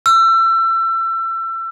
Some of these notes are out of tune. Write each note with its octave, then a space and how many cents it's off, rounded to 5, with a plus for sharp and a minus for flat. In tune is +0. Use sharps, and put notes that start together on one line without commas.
E6 +30